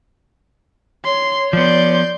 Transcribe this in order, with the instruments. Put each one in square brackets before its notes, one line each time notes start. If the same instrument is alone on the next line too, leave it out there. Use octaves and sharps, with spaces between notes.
[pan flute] C#5 [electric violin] C6
[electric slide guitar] F3 B3 [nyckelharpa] D5 [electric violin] C6 G6